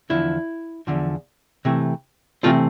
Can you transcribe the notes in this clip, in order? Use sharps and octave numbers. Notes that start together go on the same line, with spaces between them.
E2 D3 F3 E4
E2 D3 F3
C3 E3 A3 C4
C3 E3 A3 C4 F4